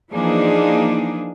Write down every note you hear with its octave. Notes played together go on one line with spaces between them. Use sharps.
E3 F3 A#3 D4 D#4 G#4